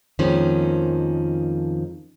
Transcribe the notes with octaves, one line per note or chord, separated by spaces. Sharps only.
F2 D#3 F3 G#3 A#3 C#4